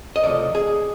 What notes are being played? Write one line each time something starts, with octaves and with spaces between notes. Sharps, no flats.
D#5
C#2 C3 F3 A3 D5
G#4